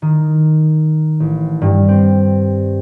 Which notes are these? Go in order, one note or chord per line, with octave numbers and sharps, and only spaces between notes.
D#3
A1
G2
C4